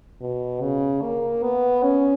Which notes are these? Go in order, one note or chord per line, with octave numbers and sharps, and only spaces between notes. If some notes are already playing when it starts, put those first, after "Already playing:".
B2
C#3
A#3
B3
C#4